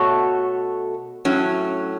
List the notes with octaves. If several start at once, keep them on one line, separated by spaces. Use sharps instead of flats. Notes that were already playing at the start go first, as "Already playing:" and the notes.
Already playing: B2 A3 F#4 A4 C#5
A2 F#3 C#4